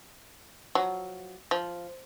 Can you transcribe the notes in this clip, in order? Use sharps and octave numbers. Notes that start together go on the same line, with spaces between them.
F3 F#3
F3